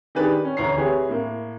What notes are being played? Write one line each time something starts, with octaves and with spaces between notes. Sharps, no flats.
D#3 D4 G4 G#4 B4 D5
C#4
D2 E3 C#5 A#5 C7
C4 E4 G4 G#4 B4 C#5
A2 A#3